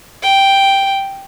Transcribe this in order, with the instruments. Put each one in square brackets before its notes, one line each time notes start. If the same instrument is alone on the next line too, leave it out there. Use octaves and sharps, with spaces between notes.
[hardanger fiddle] G5